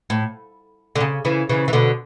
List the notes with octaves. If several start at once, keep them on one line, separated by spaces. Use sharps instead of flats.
A2
D3
C#3
C#3 E3
C#3 E3
E3
B2 D3